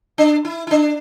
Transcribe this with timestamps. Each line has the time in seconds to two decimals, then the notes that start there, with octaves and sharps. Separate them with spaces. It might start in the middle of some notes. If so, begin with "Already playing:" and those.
0.18 D4
0.45 E4
0.67 E4
0.71 D4